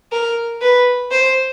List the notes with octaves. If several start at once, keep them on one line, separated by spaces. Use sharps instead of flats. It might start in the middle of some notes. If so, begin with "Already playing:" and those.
A#4
B4
C5